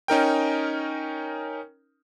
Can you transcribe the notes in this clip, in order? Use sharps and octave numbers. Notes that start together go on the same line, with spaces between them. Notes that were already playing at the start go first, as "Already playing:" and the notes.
C#4 D#4 A#4 G5